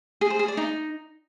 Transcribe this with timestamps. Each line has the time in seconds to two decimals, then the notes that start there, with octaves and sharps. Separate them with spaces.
0.21 G#4
0.30 C5
0.39 G#4
0.48 D5
0.57 D#4